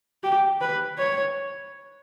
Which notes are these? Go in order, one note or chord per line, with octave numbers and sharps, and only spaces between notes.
G4
B4
C#5